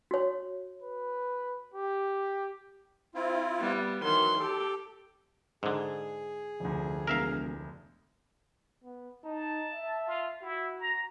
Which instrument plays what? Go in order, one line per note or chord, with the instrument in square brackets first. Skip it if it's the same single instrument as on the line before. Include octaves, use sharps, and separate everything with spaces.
[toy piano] F#4 C#5
[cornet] B4
G4
[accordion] C4 E4 F4
[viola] G3 B3
[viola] D#3 C6 [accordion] E3 F#3
[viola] G4 [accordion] A4
[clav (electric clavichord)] G#2 D3 [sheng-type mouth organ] G#4
[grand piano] F1 D2
[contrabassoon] E1 [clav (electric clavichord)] A#4 E5 F5
[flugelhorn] B3
[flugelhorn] D#4 [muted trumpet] A5
[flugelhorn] E5
[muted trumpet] F4
[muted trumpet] E4 [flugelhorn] F#4
[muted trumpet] A#5